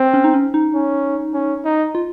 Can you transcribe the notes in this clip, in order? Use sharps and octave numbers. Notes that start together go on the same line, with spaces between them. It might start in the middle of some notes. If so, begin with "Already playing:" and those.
Already playing: C4
C#4
D#4
C#4
D#4
C#4
C#4
D#4
F4